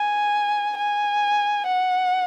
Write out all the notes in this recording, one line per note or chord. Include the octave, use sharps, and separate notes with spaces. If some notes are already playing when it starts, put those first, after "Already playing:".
Already playing: G#5
G#5
F#5